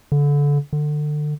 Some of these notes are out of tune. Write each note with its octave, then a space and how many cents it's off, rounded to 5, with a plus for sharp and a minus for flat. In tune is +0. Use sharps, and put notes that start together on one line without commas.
D3 -25
D3 +30